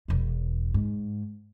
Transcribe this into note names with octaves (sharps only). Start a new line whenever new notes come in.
E1 E2
G#2